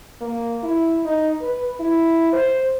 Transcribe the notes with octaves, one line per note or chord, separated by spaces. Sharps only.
A#3
E4
D#4
B4
E4
C5